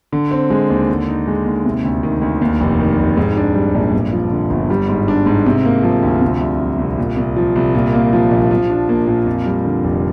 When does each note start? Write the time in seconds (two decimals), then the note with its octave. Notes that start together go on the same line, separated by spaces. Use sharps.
0.13 D3
0.31 C4
0.50 G#3
0.70 D#2
0.89 D3
1.08 D#4
1.27 G#3
1.46 D#2
1.65 C3
1.84 D2
2.03 D#3
2.21 D2
2.41 D#2
2.61 F1
2.80 D#3
2.98 F1
3.17 G#2
3.37 D4
3.55 G3
3.75 A#1
3.93 G2
4.13 F3
4.31 D3
4.50 G1
4.70 G3
4.89 G#2
5.08 D4
5.26 G#2
5.46 C3
5.65 A#3
5.83 F3
6.02 D2
6.21 C3
6.40 C2
6.60 F3
6.78 C2
6.98 A#2
7.17 C2
7.36 F3
7.56 C2
7.75 A#2
7.94 A#3
8.13 F3
8.31 A#1
8.51 F3
8.70 D4
8.89 A#3
9.07 A#2
9.26 F2
9.45 G3
9.65 D3
9.84 F1